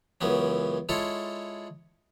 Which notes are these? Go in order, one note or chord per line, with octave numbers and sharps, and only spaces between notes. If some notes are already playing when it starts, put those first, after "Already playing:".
C#2 F#2 E3 B3 C#4
G#3 E4 F4 A4 C#5